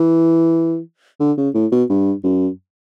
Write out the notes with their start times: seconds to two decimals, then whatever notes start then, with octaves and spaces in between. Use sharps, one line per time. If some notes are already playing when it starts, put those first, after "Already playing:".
Already playing: E3
1.20 D3
1.38 C#3
1.54 A2
1.72 B2
1.89 G2
2.24 F#2